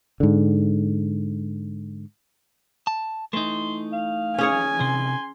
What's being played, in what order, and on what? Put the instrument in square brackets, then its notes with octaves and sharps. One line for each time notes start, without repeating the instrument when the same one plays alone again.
[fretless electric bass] G#2 D3
[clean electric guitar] A5
[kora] E3 [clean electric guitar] A3 D#4 [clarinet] C6
[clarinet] F5
[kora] C#4 G#4 C#5 [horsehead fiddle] G#5
[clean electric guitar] C3 [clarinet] C6